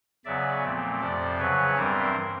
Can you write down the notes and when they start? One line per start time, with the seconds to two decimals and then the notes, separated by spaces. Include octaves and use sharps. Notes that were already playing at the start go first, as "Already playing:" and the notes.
0.25 E2 C#3 F#3 B3 D5 E5
0.63 A#2 F3 A3 C4
1.01 F2 C3 F3 C5 D5
1.39 E2 C#3 F#3 B4 C#5
1.77 G2 E3 G3 C4 A#4 C5